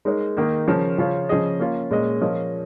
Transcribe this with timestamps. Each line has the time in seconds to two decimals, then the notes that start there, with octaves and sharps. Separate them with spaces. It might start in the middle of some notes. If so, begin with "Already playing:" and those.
0.05 G#3 D#4 A#4 C#5
0.37 D#3 A#3 D#4
0.67 C#3 F3 C#4 A#4
0.98 C#3 F3 C#4 F4 C#5
1.29 C#3 F3 C#4 G#4 D#5
1.59 A#3 C#4 F4
1.91 A#2 G#3 C#4 A#4 D#5
2.21 F3 C#4 F4 A#4 D#5